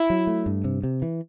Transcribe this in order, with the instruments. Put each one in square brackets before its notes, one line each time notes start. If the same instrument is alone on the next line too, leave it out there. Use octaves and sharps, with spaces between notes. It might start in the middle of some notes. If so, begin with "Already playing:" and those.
Already playing: [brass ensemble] E4
[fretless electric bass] F#3
A3
G2
C3
C3
E3